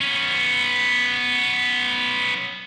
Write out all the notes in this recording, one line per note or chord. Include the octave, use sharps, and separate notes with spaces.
B3 C#4